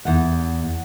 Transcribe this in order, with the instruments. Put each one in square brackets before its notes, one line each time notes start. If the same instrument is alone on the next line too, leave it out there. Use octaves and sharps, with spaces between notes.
[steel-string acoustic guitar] E2 F#5